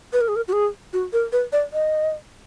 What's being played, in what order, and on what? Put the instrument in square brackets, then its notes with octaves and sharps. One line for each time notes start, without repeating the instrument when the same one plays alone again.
[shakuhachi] B4
A#4
G#4
A#4
F#4
G#4
F#4
A#4
B4
D5
D#5